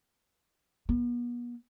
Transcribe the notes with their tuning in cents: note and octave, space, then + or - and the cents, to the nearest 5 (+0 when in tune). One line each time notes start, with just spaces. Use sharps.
B3 -40